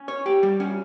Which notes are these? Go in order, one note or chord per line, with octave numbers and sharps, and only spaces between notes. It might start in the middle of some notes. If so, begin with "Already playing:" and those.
Already playing: C#4
C#5
G4
G3
C#4